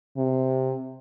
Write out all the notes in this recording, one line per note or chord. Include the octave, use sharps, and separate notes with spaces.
C3